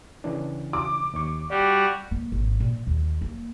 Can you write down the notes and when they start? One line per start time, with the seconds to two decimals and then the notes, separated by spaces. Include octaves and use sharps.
0.24 C#3 E3 D4
0.73 D6
1.14 D#2 C#6
1.50 G3 F#4 G4 D5
2.11 A#3
2.32 G#1
2.60 A#2
2.87 D#2
3.21 A#3